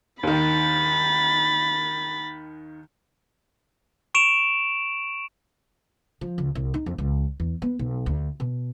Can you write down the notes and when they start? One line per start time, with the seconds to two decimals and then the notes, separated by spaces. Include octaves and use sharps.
0.23 D#2 D#3 B5 A6
4.15 C#6 D7 E7 F7
6.21 F3
6.38 C#2
6.55 C2
6.74 D#4
6.86 F2
6.98 C#2
7.40 E2
7.62 B3
7.79 B1
8.06 D2
8.40 B2